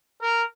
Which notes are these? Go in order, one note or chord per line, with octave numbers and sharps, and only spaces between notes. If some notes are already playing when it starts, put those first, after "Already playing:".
A#4